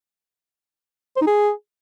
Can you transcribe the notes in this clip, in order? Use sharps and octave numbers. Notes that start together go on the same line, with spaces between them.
C5
D#4
G#4